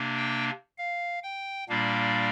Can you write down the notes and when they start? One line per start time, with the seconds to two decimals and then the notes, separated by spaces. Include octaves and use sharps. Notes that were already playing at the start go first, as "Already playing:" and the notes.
Already playing: C3 A#3 D4
0.17 G5
0.78 F5
1.23 G5
1.69 A#2 G3 A#3 D4 F5